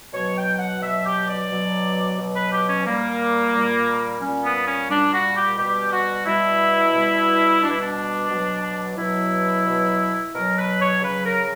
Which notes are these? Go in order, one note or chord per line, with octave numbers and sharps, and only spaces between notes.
B2 F#3 C#5
G5
F#5
B2 F#3 E5
G4
D5
B2 F#3
B2 F#3
B4
G4
C#4
A#2 G3 A#3
A#2 G3
A#2 G3 C#4
B3
C#4
A#2 G3 D4
F#4
G4
B2 G3 G4
F#4
B2 G3 E4
B2 G3
B2 G3 D4
E4
D4
B2 F#3
B2 F#3 E4
B2 F#3
B2 F#3 A#4
B4
C#5
C#3 F#3 B4
A#4